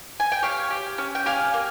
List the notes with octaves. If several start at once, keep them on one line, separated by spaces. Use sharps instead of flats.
G#5
G5
G4 C#5 F5
G4
C#4
G5
G4 F5 G#5
A#3